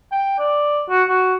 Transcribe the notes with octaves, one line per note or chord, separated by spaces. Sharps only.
G5
D5
F#4
F#4